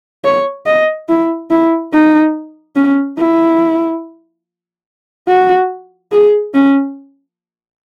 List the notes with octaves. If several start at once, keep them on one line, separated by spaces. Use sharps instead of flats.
C#5
D#5
E4
E4
D#4
C#4
E4
F#4
G#4
C#4